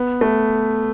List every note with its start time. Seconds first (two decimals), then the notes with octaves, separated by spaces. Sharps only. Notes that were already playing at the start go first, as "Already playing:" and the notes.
Already playing: B3
0.21 A3